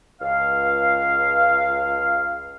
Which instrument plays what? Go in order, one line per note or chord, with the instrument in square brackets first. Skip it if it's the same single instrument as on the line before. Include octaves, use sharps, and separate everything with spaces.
[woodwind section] C#2 F5